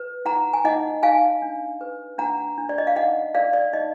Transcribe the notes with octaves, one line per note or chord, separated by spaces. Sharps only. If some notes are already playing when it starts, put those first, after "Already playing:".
Already playing: B4
D#4 F#5 A#5
G#5
D#4 D#5 F#5
D#4 F5 G#5
D4
B4
D4 F#5 A#5
D4
D5
D#5
F5
D#4 D#5 F#5
A#4 D5 F5
D5
D#4 D#5